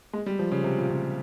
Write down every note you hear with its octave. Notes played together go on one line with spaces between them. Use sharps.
G#3
G3
F3
C#3
C3
A#2
C#3